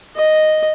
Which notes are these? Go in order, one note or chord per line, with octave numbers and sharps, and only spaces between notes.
D#5